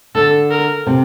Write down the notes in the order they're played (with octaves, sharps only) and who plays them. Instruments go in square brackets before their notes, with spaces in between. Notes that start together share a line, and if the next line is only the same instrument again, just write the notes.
[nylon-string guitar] D3 [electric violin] A4
[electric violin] A#4
[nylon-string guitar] C3